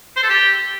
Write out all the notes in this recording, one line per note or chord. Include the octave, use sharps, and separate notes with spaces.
C5
A4
G4